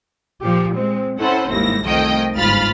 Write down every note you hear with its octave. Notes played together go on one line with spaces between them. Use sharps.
A#2 F3 G4
G#3 C4
C4 C#4 E4 A4 C5 F#5
G1 D#2 G#2 E4 A#6
C2 F2 D#3 A3 D#5 G5
G1 G#2 F4 B5 F6 A6